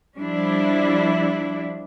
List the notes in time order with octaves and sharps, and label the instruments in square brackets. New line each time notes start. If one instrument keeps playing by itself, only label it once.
[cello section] F3 G3 D4 E4